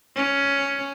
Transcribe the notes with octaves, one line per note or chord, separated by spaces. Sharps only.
C#4